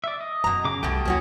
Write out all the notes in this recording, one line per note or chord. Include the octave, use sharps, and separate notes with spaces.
D5 E5
D#5
F#2 B2 A#5
C#3 D6
C2 B2 G3 A3 G5 D#6
D#2 F#3 A#3 C#4 F#4